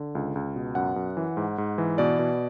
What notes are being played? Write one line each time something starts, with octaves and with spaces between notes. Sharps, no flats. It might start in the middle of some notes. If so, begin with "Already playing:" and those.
Already playing: D3
C#2
C#2
B2
F#2 F#5
F#2
E3
G#2
G#2
E3
B2 D5
B2